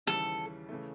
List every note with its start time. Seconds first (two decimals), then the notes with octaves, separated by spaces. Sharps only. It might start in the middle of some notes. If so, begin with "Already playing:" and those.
0.07 D#2 C#3 E3 G3 A4
0.69 C#3 E3 A3